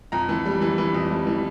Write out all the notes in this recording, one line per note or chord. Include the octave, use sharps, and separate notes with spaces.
F2 A#5
E3
G3
E3
E3
F2
G3
E3